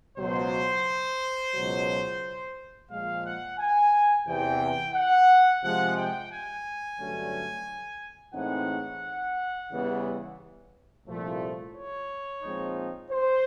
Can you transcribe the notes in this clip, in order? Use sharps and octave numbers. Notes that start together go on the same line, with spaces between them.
C#2 B2 F#3 C5
C#2 B2 F#3
A#2 F3 G#3 F5
F#5
G#5
E2 C3 E3 G5
F#5
C3 F3 G#3 F#5
G5
G#5
G2 D3 F#3 A3 C#4
A2 E3 G#3 C4 D#4 F#5
C#3 E3 G3 B3
C2 A#2 F3 A3
C#5
A#2 F3 G#3 C4 D#4
C5